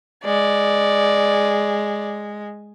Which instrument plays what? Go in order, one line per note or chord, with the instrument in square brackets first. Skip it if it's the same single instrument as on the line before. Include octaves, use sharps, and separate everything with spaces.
[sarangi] G#3 [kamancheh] D5